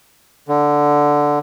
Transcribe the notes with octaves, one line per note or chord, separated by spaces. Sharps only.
D3